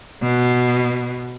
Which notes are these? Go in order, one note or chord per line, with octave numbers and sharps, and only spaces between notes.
B2